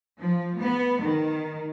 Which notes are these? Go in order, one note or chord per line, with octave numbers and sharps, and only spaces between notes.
F3
B3
D#3